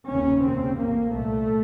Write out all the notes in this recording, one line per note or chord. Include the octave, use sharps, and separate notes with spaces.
F1 D#2 C#3 C#4
F1 D#2 C#3 C4
A1 A2 A#3
C2 A#2 A3